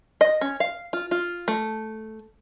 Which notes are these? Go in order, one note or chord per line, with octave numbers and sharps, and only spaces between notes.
D#5
C#4
F5
F4
F4
A3